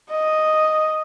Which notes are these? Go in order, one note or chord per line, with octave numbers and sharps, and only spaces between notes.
D#5